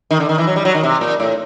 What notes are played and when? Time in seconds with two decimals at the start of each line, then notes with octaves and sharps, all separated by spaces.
0.11 D#3
0.20 D3
0.29 D#3
0.38 E3
0.47 F#3
0.56 G3
0.65 F#3
0.74 D#3
0.83 C3
1.01 A#2
1.20 A2